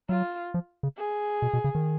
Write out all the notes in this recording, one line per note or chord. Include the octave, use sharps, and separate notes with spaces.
F#3 F4
F3
C#3
G#4
B2
B2
C#3
D#3